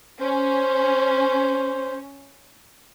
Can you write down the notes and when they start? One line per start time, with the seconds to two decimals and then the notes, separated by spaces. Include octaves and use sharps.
0.21 C#4 C5